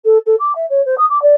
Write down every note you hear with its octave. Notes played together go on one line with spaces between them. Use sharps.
A4
A4
D6
E5
C#5
C5
D#6
D6
D5